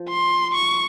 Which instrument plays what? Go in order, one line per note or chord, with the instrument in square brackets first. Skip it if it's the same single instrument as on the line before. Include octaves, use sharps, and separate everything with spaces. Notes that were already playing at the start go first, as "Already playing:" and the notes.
Already playing: [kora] F3
[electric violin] C6
C#6